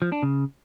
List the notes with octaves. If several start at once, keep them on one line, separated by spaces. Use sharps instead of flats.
F3
D4
C#3